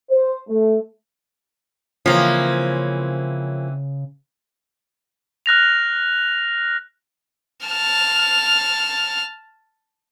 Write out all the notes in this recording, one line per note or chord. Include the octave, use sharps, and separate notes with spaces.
C5
A3
C#3 E3 F3 A#3 C4 C#4
F6 F#6 A#6 F7
A5 F6